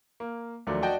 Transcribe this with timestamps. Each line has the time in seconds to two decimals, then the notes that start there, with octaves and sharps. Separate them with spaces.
0.20 A#3
0.67 D#2 F3 F#3 A3 D4
0.82 D4 F#4 D5 D#5 G5 A5